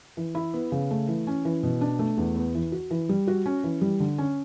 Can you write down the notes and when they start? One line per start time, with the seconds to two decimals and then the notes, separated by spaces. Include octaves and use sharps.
0.17 E3
0.35 E4
0.54 B3
0.72 C#3
0.91 A3
1.08 E3
1.27 C#4
1.45 E3
1.63 B2
1.81 D4
1.99 A3
2.17 E2
2.36 B3
2.55 E3
2.72 F#4
2.91 E3
3.09 G3
3.27 F#4
3.46 C#4
3.64 E3
3.81 G3
4.00 D3
4.18 C#4